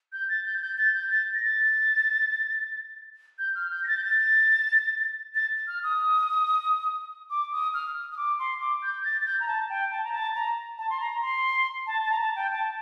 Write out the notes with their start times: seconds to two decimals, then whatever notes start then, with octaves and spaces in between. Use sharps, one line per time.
0.13 G6
0.29 A6
0.45 G6
0.57 A6
0.62 G6
0.78 A6
0.94 G6
1.11 A6
1.34 A#6
1.43 A6
3.39 G6
3.55 F6
3.71 G6
3.84 A#6
3.88 A6
3.97 G6
4.04 A6
5.35 A6
5.68 F6
5.83 D#6
7.30 D6
7.52 D#6
7.74 F6
8.12 D#6
8.17 D6
8.39 C6
8.61 D6
8.82 G6
9.04 A6
9.21 A6
9.26 G6
9.40 A#5
9.48 A5
9.70 G5
9.91 A5
10.04 A#5
10.13 A5
10.35 A#5
10.78 A5
10.90 C6
11.00 A#5
11.22 C6
11.87 A5
12.04 A5
12.11 A#5
12.19 A5
12.36 G5
12.52 A5